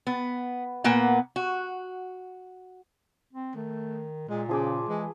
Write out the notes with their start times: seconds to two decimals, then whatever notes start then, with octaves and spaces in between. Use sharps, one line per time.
0.07 B3
0.84 A#2 A#3 B3 F#5
1.36 F#4
3.33 C4
3.56 D#3 A3
4.29 A#2 G#3
4.49 C#3 F3 G#4 D6
4.88 E3 G#3